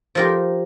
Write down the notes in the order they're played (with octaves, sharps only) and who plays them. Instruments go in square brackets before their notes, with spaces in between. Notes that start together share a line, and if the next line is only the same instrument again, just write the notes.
[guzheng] F3 D#4 G4 A#4